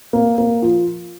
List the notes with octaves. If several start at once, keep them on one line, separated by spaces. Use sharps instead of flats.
A#3
A#3
F3